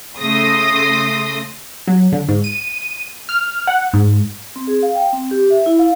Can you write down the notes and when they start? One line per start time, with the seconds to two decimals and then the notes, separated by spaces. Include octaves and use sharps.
0.19 C#3 A3 C6 D#6 A#6
1.87 F#3
2.12 D3
2.28 G#2
2.44 D#7
3.29 F6
3.67 F#5
3.93 G#2
4.56 C4
4.67 G#4
4.82 F5
4.95 G5
5.13 C4
5.31 G4
5.50 E5
5.66 E4
5.79 F5